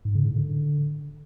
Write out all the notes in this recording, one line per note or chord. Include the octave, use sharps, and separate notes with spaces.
G#2
C#3
A2
D3